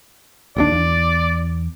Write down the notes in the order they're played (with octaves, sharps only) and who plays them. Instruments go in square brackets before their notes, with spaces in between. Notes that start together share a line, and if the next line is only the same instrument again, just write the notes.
[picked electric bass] D1 D#2 D4 [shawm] D5
[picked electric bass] E2